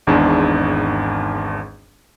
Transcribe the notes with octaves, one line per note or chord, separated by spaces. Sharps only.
G#1 E2 G#2 D4